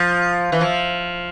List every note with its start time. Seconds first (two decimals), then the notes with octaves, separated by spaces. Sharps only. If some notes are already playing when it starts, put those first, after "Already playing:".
Already playing: F3
0.52 E3
0.61 F3